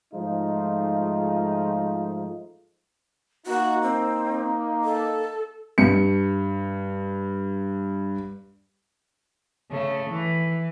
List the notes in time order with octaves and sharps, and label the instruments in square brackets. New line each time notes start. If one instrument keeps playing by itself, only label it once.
[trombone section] G#2 F3 G#3 A3 D#4 F4
[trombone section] A#3 D#4 [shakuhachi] F#4
[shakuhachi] C4
A4
[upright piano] G2 C#7
[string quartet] C#3 A3
E3